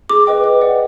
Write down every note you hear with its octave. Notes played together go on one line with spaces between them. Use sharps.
G#4 D6
B4 D#5 G5
B4
D5 F#5